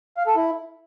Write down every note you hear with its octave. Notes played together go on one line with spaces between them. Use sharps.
F5
A4
E4